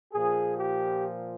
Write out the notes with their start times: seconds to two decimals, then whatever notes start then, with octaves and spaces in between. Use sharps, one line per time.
0.13 A#2 F3 G#4
0.58 G4